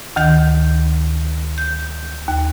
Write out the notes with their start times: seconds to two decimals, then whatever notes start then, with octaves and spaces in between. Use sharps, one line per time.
0.16 D2 D#3 G6
1.58 G6
2.28 D#2